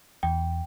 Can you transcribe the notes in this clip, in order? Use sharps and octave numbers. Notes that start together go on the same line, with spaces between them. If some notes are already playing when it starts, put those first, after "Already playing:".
E2 G5